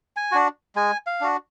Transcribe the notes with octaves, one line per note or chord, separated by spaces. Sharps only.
G#5
D4 F#4
G#3 G#5
F5
D4 F#4